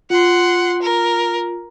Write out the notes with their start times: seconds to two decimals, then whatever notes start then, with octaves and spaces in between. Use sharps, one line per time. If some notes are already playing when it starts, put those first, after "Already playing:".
0.10 F4 F#5 C6
0.82 A#4